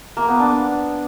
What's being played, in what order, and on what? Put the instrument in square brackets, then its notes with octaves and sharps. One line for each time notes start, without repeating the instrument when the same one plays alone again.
[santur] A#3
B3
D4